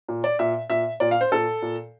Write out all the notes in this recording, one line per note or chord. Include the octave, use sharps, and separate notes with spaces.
A#2
D5
A#2 E5
A#2 E5
A#2 D5
F5
C5
A#2 A4
A#2